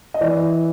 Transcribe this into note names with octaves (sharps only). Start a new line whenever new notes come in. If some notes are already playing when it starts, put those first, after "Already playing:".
D#5
E3 D5